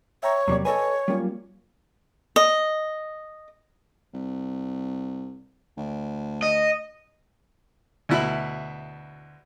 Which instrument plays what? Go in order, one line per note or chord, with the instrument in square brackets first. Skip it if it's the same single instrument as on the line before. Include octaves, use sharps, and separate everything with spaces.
[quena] C#5 [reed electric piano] E5 G5 A#5
[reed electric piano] E2 C3 D5 [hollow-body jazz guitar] F#3 G3 A#3
[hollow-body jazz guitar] A4 D#5 G#5 [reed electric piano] B4 [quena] C#5
[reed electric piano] F#3 A#3 F4 [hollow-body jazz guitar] G3 C#4
[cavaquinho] D#5
[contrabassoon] C2
D2
[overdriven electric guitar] D#5
[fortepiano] D2 B2 E4 B5